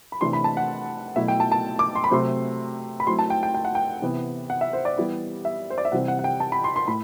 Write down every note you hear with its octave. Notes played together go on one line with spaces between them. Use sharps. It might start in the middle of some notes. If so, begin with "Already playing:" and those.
B5
C3 E3 A3 D4 C6
B5
A5
F#5
B2 F#3 A3 E4 E5
G5
A5
A5
D6
C6
B5
C3 F#3 A3 C4 C6
B5
F#3 A3 C4 E4 C6
A5
G5
G5
G5
F#5
G5
C3 E3 B3
F#5
E5
C5
D5
E3 G3 B3 E4
E5
C5
D5
E5
C3 E3 G3 C4 F#5
F#5
F#5
G5
A5
B5
C6
C6
A2 B5